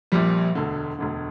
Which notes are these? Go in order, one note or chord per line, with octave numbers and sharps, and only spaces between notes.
A#1 A#2 F3 G3
E1 D2 D3
E1 D2 D3